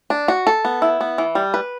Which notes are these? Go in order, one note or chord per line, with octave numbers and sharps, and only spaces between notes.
D4
F#4
A4
B3
E4
B3
E3
G3
B4